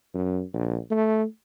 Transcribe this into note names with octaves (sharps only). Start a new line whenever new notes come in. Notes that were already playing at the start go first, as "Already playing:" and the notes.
F#2
A#1
A3